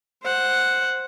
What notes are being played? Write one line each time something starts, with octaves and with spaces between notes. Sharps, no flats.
C5 F#5